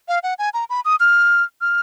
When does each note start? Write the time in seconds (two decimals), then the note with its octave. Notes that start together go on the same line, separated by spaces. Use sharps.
0.08 F5
0.23 F#5
0.39 G#5
0.54 A#5
0.70 B5
0.85 D#6
1.00 F6
1.61 F6